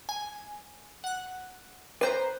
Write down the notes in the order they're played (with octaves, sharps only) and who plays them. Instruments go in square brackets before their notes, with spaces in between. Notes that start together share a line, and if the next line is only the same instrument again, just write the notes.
[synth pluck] G#5
F#5 F#6
[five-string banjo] B4 C5 [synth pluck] A#5 C7